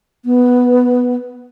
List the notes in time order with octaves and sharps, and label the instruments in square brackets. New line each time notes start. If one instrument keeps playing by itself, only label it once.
[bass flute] B3